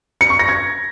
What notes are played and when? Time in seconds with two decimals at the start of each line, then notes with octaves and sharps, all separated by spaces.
0.21 C#7
0.30 C#6
0.39 A#6
0.49 G#6